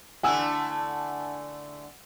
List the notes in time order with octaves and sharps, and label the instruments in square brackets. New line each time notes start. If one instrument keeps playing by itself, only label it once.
[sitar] D3 A3 E4 [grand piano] F#5 G#5 E6